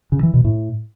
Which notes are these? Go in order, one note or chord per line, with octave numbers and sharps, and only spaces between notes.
C#3
E3
B2
A2